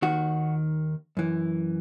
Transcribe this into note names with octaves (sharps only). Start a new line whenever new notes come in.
D#2 D#3 F#4
F#2 E3